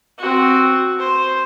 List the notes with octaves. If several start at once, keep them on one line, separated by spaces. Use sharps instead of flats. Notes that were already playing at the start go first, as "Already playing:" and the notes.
C4 F#4
C5